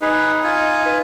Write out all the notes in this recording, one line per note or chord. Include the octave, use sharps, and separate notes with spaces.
D#4 G#4 B4
F4 G#5
B4